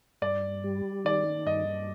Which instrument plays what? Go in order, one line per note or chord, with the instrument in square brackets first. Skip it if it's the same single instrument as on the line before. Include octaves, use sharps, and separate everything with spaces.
[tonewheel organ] G2 [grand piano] D5
[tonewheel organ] G3
[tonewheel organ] D#3 [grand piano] D5
[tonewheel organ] G2 [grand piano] D#5